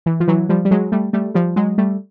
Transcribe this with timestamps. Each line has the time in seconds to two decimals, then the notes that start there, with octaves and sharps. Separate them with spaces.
0.06 E3
0.20 F3
0.28 E3 F#3
0.49 F3 G3
0.65 G3
0.71 F#3 G#3
0.92 G3 A3
1.13 G3 A3
1.34 F3 G3
1.56 F#3 G#3
1.78 G3 A3